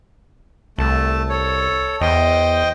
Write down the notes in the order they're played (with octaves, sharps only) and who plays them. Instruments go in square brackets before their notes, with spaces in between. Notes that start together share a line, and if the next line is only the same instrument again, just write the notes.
[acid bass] C2 [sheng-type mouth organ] A3 A5
[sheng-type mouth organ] A4 C#5
[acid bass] E2 [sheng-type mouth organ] C5 D#5 G5